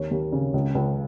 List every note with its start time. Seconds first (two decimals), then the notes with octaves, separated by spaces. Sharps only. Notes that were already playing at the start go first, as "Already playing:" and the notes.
Already playing: D#2 C#5
0.11 D#2
0.32 C#3
0.54 C#2
0.75 C#2